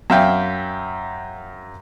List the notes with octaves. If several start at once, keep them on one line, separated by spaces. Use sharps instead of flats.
F#2 E5 F5 G5